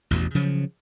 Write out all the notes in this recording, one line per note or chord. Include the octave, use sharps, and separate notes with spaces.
A1 E2 B2
C#3 F3 F#3